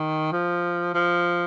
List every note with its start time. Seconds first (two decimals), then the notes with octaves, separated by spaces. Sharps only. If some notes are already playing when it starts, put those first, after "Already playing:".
Already playing: D#3
0.32 F3
0.94 F3